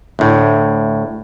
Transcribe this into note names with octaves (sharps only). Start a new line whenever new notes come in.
D2 A2